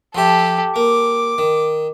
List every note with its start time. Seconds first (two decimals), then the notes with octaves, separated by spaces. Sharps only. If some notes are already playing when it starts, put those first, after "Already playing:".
0.15 F3 G4 A4 E5
0.76 A#3 D6
1.38 D#3